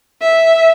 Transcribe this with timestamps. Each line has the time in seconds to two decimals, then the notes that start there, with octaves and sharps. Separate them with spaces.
0.22 E5